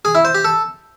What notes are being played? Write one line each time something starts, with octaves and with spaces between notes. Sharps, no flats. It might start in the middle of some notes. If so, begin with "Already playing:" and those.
G#4
E4
C5
G4
A4